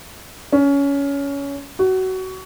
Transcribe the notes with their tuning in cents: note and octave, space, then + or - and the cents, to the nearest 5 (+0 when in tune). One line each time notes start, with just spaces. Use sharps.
C#4 +20
F#4 +20